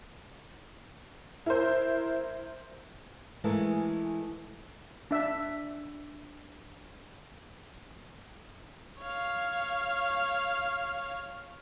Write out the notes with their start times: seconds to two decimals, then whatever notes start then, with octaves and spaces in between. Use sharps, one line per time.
1.46 E4 A#4 C5
3.44 E3 G#3 A3 G#4 A#4
5.11 D4 E5
9.01 C#5 F5